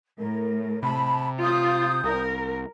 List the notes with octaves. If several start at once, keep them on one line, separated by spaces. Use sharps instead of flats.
A2 A#4
C3 A5 B5
F4 D#6 G6
C2 A#4